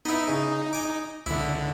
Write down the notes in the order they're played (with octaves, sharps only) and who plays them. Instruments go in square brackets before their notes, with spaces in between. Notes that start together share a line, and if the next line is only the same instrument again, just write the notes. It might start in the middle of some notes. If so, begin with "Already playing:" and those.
[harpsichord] B3 E4 [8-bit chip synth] D#4
[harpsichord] C#3
G#5 D6
[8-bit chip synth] C#2 D3 [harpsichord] E4